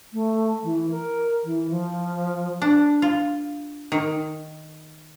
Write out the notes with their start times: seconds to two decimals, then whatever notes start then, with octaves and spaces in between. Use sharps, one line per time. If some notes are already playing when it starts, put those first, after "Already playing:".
0.13 A3
0.63 E3
0.91 A#4
1.44 E3
1.70 F3
2.62 D4
3.02 F4
3.92 D#3